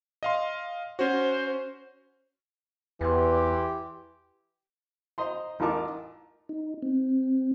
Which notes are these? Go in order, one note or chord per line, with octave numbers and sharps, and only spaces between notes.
D#5 F5 C6
C#4 F#4 C5
E2 E3 G4 B4 C6
C5 D#5 A#5 C6
A1 D#4 F4 A#4 A5 D6
D#4
C4